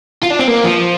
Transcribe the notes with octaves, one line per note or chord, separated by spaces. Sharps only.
F4
D4
C4
A#3
F3